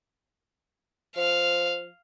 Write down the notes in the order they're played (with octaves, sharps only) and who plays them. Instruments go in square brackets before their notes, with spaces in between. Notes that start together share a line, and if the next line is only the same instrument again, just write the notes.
[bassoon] F3 [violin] F5